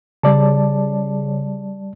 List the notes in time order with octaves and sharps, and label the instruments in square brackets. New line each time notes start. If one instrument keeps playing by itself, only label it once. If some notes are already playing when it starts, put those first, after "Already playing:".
[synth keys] C#3 [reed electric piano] G3 D5 A5